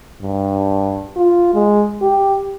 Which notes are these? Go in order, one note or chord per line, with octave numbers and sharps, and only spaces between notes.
G2
F4
G#3
G4